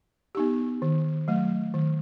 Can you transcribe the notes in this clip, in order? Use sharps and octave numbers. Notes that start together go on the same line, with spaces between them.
B3 D#4 G4
D#3
F#3 A3
D#3